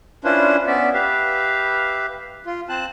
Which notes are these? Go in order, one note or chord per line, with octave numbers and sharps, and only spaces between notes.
C#4 D4 E4 F4 B4 C5
B3 C#4 D5 E5
G4 B4 E5 F5
F4
C4 C5 A5 F#6